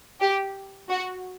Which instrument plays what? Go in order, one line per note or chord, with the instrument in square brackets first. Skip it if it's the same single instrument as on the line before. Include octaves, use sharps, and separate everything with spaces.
[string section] G4
F#4